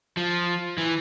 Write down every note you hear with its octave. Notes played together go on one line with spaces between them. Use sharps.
F3
E3